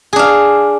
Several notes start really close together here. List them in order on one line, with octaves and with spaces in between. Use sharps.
G#4 D4 F5